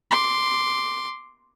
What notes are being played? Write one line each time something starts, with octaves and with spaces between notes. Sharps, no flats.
C6 D6